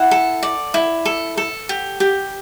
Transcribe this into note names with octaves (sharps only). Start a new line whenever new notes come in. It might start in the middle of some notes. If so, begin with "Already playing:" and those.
Already playing: E4 F#5
A4
D5
E4
A4
A4
G4
G4